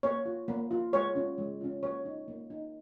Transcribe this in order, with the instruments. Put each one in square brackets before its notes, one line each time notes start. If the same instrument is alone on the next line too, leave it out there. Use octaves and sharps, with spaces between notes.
[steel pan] A#3 C#5
F4
A#3
F4
G#3 C#5
C#4 F4
G#3
C#4 F4
A#3 C#5
D#4
A#3
D#4